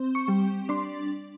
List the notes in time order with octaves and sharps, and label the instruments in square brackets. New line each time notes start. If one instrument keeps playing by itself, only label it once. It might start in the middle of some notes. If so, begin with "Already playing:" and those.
Already playing: [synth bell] C4
C#6
G3
D4 C6